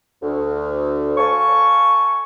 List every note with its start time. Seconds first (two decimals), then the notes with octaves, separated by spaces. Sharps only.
0.22 D2
1.17 A4 F5 G#5 C#6